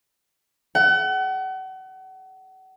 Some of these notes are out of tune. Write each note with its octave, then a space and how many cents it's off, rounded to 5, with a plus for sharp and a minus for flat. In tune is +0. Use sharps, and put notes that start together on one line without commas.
F#5 +35